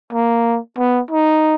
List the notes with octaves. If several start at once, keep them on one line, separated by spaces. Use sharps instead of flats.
A#3
B3
D#4